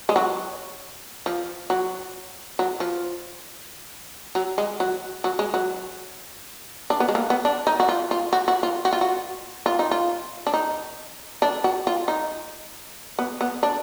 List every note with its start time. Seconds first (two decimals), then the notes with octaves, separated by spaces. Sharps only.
0.09 G#3
0.16 F#3
1.26 F3
1.70 F#3
2.59 F#3
2.80 F3
4.35 F#3
4.58 G#3
4.80 F#3
5.24 F#3
5.39 G#3
5.54 F#3
6.90 D4
7.00 B3
7.09 G#3
7.15 A#3
7.30 B3
7.45 D4
7.67 D#4
7.80 F#4
7.89 F4
8.11 F4
8.33 F#4
8.48 F#4
8.63 F4
8.85 F#4
8.93 F4
9.01 F#4
9.66 F4
9.79 D#4
9.91 F4
10.47 D4
10.54 D#4
11.42 D4
11.64 F#4
11.87 F4
12.08 D#4
13.19 B3
13.41 B3
13.63 D4